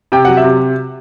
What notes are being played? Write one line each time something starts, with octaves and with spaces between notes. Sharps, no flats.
C3 G5
F#3 F#5
E5
C3